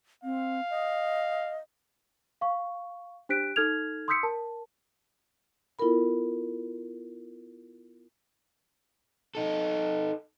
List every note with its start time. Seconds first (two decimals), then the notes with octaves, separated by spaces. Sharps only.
0.24 C4 F5
0.70 D#5
2.41 F5 C#6
3.29 D4 G4 C5 F#6 B6 D7
3.56 D#4 A4 F6 G#6 F7
4.08 C6 D#6 E6 G6 B6 C#7
4.23 A#4 A5
5.79 B3 E4 F4 A4 A#4 B5
9.35 D#4 A4